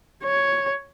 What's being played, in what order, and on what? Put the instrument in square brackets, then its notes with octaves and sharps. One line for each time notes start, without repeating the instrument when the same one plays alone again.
[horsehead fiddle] C#5